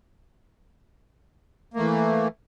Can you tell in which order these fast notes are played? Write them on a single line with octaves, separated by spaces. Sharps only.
A#3 A3 E3